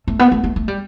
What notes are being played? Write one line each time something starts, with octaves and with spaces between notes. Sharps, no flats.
A3
B3
A3
A3
A3
G3